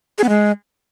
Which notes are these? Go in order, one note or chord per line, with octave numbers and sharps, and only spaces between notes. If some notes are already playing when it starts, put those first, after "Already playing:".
G#4
B3
G#3